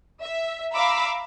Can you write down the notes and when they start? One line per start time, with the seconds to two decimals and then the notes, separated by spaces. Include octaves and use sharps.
0.22 E5
0.73 E5 F5 A#5 B5 D6 E6